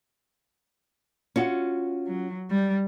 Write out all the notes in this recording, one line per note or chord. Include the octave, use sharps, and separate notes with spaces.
C#4 F4 F#4
F#3
G3